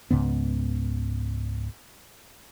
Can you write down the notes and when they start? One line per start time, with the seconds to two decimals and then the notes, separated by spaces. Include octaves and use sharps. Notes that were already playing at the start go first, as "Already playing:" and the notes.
0.11 C#2 G#2 C#3 B3